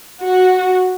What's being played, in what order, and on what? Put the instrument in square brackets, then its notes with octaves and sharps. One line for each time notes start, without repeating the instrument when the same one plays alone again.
[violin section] F#4